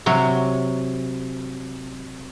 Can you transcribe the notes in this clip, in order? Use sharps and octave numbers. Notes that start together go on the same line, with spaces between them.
C3 F#3 C#5